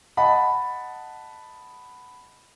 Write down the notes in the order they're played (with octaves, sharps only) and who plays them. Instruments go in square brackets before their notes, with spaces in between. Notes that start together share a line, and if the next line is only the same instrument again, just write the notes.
[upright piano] D#5 F#5 A5 B5